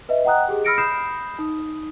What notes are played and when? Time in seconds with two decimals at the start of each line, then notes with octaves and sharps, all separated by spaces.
0.09 B4 D#5 E5
0.24 D#5 F#5 G5 A#5 D#6 F#6
0.48 G4 G#4
0.65 B5 E6 F6 A#6 C#7 D7
0.78 B5 D#6 G6 C7 E7
1.39 D#4 D#6